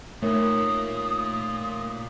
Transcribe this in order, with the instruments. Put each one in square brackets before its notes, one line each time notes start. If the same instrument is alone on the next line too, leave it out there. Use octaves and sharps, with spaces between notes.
[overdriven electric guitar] A#2 A#3 [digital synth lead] A3 [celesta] D#4 A#4 C#5 [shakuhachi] D#6